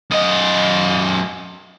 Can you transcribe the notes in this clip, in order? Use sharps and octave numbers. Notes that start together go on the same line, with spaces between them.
F#2 D#5